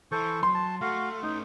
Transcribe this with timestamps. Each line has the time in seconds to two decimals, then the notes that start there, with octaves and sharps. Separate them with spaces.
0.12 E3 A4 C5 C#6
0.43 F#3 C6
0.54 A5
0.81 A3 F#4 F5
1.22 A3 C#4 D#4